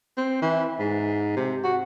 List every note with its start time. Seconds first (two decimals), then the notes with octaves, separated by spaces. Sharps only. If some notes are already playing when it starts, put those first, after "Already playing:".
0.17 C4
0.42 E3
0.79 G#2
1.37 C3
1.64 F#4